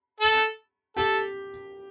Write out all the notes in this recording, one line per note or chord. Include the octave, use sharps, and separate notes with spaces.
A4
G4 A4